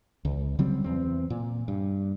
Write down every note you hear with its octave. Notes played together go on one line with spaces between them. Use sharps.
C#2
C#3 F#3 G3 C4
E2 C4
A#2
G2